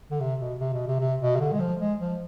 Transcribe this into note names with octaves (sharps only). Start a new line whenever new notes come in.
D3
C3
B2
C3
B2
C3
C3
B2
C3
D3
G#3
F3
G#3
F3